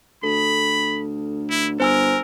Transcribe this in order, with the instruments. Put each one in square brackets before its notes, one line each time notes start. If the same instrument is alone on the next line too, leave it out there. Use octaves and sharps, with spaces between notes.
[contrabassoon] D2 [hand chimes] A4 [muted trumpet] B5
[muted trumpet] E4
[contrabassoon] G1 [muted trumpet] A#4 [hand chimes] C5 G#5 E6